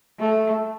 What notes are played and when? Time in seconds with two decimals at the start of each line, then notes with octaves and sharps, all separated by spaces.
0.19 A3